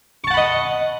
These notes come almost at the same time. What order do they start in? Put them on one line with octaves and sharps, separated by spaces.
C#6 A5 F#5 B5 D#5